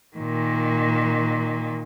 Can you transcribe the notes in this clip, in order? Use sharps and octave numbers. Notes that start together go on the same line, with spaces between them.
A#2 D#3